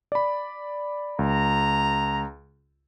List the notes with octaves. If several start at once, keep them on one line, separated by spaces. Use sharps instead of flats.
D5 B5
C#2 A#5